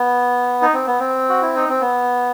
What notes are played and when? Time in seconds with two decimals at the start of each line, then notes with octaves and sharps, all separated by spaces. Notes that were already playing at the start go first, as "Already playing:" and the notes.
Already playing: B3
0.62 D#4
0.73 C4
0.87 B3
1.00 C4
1.29 F#4
1.42 E4
1.56 D#4
1.69 C4
1.81 B3